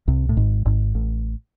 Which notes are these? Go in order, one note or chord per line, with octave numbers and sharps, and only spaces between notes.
C2 C3
A2
G#1 G#2
G#1 G#2
A1 A2